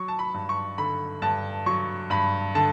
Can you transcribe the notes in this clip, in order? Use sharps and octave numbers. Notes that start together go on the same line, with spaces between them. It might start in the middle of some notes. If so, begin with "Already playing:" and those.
Already playing: F#3 C#6
A5
B5
G2
C#6
D3 B5
G2 A5
F#3 C#6
G2 B5
D3 A5